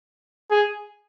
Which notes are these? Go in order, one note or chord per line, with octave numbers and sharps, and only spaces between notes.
G#4